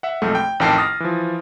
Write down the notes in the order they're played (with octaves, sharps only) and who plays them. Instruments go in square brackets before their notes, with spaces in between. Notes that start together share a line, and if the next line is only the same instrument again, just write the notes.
[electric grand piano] E5 F#5
B1 F2 G#3 A3
G5
A1 F2 D#3 G5 A5 C7
D#6 F6 A6 A#6
E3 F3